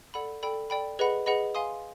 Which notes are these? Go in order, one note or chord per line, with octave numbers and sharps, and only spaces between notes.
A4 D5 F#5 B5
A4 D5 G5 B5
A4 D5 G5 B5
G#4 B4 D#5 F#5 B5
G#4 B4 D#5 F#5 B5
F5 G#5 C6 D#6